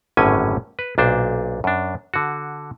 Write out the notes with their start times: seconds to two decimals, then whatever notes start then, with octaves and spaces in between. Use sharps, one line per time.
0.17 G#1 F#2 A2 D3 C#4 G#5
0.79 B4
0.98 B1 A#2 D4 C5
1.64 F#2 D4
2.14 D3 F#4